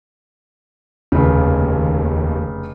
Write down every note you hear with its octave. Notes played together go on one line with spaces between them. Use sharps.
F1 D#2 C#3